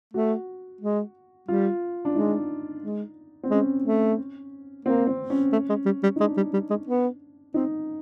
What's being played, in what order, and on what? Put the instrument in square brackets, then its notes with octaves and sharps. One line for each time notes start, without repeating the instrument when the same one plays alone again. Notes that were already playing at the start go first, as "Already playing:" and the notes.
[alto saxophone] A3 [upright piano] F#4
[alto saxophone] G#3
[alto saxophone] G3 [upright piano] F4
[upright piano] D4
[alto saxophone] G#3 [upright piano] D#4
[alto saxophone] G#3
[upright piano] C4
[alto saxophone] G#3 [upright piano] C#4
[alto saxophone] A3
[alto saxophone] A#3 [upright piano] C4
[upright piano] C4
C#4
[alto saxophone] A3
G#3
G3
G3
[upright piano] D#4
[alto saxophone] G#3 [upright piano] D4
[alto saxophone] G3
G3
G#3
B3
[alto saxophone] C4 [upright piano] D#4